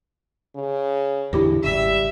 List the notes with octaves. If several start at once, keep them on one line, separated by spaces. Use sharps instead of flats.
C#3
E2 A2 D3 E4 G4 A#6
G#1 C#3 G3 E5